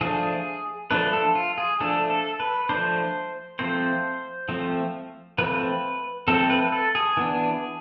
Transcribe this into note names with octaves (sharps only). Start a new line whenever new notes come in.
F3 A3 D4 G#4
F3 A3 D4 B4
A4
F4
G#4
F3 A3 D4 A4
A4
B4
F3 A3 D4 C5
F3 A3 C4 C5
F3 A3 C4
F3 A3 C4 B4
F3 A3 C4 A4
B4
A4
G#4
E3 B3 D4